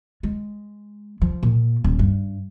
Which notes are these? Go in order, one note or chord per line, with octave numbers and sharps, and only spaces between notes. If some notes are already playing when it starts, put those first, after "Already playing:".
G#3
F3
A#2
D#1
G2